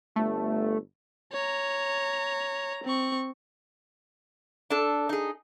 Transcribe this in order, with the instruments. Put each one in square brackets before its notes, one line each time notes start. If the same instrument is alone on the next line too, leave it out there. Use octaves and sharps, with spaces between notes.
[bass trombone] G1 [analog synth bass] A3
[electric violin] C#5 A#5
C4 C#6
[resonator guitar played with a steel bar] D4 A4
D#4 G#4